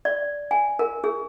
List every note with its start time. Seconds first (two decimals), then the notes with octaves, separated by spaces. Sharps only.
0.05 D5
0.51 G#5
0.79 A#4
1.04 G#4